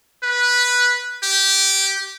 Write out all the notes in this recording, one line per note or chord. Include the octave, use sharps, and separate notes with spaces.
B4
G4